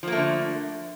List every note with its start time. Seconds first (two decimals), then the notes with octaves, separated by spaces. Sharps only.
0.03 F3
0.08 A#3
0.12 A3
0.17 D3